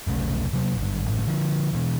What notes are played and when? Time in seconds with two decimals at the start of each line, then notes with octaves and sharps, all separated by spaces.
0.07 F1 B1 C#3 A3
0.53 C3 F#3 A#3
0.77 G#1 G2
1.06 G#1 F#2 A2
1.27 D3 F3
1.73 B2 E3